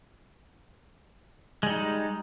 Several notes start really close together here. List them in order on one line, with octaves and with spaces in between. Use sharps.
G#3 G3 D#4